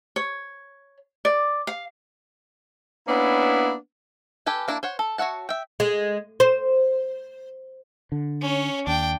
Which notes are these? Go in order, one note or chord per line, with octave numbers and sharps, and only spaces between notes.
C#5
D5
F5
A#3 B3 C#4 D4 E4
G4 A4 B4 G#5
A#3 D4 E4 D#5 A5
C5 C#5 F#5
A4
F#4 C#5 E5 F#5 A5
E5 G5
G#3
C5
D3
C#4 C#5
D#2 D4 G5